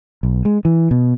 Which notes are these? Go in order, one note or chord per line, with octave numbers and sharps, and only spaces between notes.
B1
G#3
E3
B2